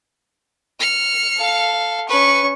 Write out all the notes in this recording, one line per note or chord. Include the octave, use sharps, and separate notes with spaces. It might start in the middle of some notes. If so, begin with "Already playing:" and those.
F6 C#7
A4 F5
C#4 B4 C#6